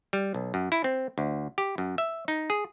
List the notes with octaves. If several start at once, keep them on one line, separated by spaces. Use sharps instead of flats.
G3
B1
F#2
E4
C4
D2
G4
F#2
E5
D#4
G#4